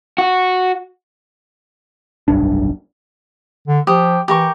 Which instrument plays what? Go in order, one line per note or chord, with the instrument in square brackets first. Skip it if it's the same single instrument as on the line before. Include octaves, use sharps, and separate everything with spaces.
[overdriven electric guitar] F#4
[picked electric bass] F1 B1 G2 D4
[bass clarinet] D3
[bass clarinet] F3 [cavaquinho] G4 D#6
[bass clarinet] E3 [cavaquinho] G4 A#4 C#6